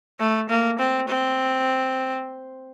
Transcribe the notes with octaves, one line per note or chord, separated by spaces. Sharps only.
A3
A#3
C4
C4